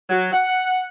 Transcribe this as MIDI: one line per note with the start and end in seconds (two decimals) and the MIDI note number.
0.10 0.30 54
0.33 0.86 78